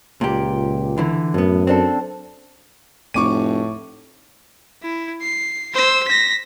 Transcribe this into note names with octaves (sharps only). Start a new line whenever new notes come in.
C#2 A#2 G4
D3 E3
F#2 A2 B3
C4 D4 A4
F1 A2 C#6 D6 D#7
E4
C7
C5 E6
A#6 B6